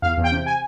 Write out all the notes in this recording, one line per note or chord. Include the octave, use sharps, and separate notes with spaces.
E2 F5
E2
G5
C3
G#5